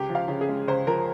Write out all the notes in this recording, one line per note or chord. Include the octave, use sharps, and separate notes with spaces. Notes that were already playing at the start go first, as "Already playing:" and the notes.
Already playing: C#2 G4
F3
F5
C#3
G#4
G#3
C#2 C5
F3 A#4